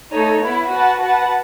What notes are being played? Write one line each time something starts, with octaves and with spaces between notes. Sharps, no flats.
A3 D#4 A4 C#5
B3 E4 B4
F#4 B4 F#5 A5
F#4 B4 F#5 A5